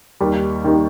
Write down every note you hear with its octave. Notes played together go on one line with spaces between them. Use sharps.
D#2 D#3 G3
D#2 D#3 G3